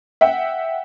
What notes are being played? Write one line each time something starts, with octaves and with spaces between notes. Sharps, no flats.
E5 F#5 G5